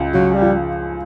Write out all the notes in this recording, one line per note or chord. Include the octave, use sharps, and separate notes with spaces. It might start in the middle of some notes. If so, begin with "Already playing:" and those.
Already playing: C#2 G#3
C#3 F#3
G3
F3